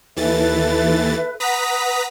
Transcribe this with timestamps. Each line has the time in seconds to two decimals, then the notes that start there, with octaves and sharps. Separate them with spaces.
0.17 D#2 E3 A4 B4 E5 A6
1.40 B4 F#5 A#5 D#6 B6